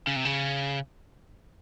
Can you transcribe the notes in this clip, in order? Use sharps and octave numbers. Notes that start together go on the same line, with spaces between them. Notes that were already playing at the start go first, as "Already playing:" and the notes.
C#3
C3
C#3